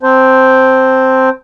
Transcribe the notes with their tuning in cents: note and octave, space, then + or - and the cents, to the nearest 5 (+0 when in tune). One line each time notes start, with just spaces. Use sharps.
C4 +0 C5 +0 A5 +0